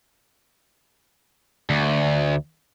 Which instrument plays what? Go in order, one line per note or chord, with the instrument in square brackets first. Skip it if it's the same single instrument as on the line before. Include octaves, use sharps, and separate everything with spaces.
[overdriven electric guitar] D2